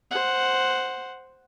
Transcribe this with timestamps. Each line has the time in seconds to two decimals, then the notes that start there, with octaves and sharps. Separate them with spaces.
0.11 C5 F#5